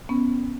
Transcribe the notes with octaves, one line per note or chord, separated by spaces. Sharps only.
B3 C#4